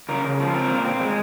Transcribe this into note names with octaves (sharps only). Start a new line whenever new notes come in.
C#3 A#4
C#3
F3
C4 A#4
A#2
C4
G#3